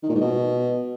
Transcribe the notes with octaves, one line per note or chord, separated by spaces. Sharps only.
D#3
A#2
G#2
B2